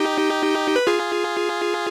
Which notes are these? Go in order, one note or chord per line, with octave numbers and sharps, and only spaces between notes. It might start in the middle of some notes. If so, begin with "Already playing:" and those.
Already playing: D#4 G4
B4
F4 G#4